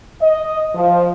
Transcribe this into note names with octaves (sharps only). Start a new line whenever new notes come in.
D#5
F3